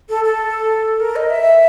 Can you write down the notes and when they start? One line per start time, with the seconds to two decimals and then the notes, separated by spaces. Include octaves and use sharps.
0.09 A4
0.24 A4
1.00 A#4
1.16 D#5
1.30 E5